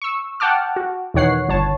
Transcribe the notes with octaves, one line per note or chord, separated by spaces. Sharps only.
C#6 E6
F#5 G5 A5 D6 F6
F#4
E2 B2 D#3 C#5 F#5 C7
G1 C#5 A5